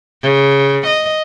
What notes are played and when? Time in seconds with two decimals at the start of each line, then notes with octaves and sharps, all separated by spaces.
0.23 C#3
0.87 D#5